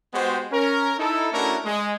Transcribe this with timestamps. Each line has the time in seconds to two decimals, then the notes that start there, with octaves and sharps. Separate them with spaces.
0.13 G#3 B3 F#4 G4 C5
0.51 C#4 A#4
0.97 D#4 E4 A4
1.32 A3 C#4 D4 E4 F#4 A#4
1.65 G#3